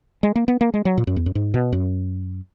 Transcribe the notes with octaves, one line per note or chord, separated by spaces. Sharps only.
G#3
A#3
B3
A#3
G#3
F#3
A#2
F#2
E2
F#2
G#2
B2
F#2